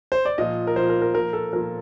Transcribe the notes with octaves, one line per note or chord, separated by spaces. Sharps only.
C5
D5
A#2 F3 D#5
A#4
A#2 F3 C5
A#4
A#4
A#2 F3 A#4
A4
A#2 F3 A#4